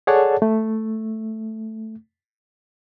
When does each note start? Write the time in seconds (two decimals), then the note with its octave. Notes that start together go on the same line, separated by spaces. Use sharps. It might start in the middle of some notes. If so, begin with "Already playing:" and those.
0.07 G#4 A4 C#5 D5 F#5 A5
0.42 A3